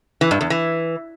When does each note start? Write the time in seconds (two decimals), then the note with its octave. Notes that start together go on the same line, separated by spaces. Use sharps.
0.21 E3
0.31 G2
0.41 E2
0.50 E3